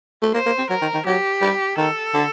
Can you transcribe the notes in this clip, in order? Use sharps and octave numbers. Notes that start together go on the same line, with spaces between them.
A3
A#3 C5
A#3
C4
F#3 A#4
D#3
D#3
F#3 G4
G3
D#3 A4
D3